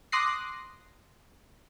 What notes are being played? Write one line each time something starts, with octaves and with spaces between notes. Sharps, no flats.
C6 D6 D#6 F#6 A#6 C7